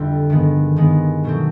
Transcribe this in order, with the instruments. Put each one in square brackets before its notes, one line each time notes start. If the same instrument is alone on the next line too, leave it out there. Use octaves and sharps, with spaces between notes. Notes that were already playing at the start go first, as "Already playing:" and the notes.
Already playing: [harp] F2 D3 G3 C4 E4
G2 D#3 G#3 B3
G2 D#3 G#3 B3
B2 F#3 A3 C4